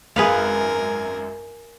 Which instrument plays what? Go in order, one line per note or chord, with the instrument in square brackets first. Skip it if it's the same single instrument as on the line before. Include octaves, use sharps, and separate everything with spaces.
[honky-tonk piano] G#1 F#2 [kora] G#4 B4 F5 [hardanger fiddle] A#4 G#5